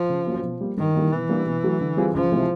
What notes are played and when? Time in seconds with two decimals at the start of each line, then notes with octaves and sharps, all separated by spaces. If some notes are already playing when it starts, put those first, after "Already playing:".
Already playing: F3
0.09 C#3
0.27 F#3 A#3 C#4 F#4
0.43 B2
0.61 G3 A#3
0.77 G2 D#3
0.95 E3 G3 A#3 D#4
1.12 B2 E3
1.29 G3 A#3 D4 G4
1.46 B2
1.63 F#3 A3
1.81 D3
1.97 G3 C4 F4 G#4
2.14 C#2 F3
2.32 C3 E3 G#3 C4